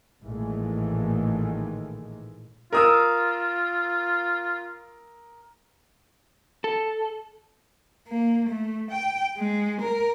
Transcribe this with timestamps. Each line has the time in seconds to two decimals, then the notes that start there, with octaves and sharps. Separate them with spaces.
0.22 A1 A#2 D#3 E3 G#3 A3
2.73 F4 A#4 D#6 E6
6.64 A4
8.08 A#3
8.49 A3
8.91 G5
9.38 G#3
9.81 A#4